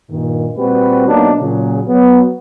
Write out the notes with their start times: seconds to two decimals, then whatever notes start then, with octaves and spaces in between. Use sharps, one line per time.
0.11 G2 A#2 D#3
0.57 A#2 G3 C4 F#4 G4 B4
1.07 B2 F#3 A#3 D4 D#4
1.41 A#2 C#3 F#3
1.88 F#3 B3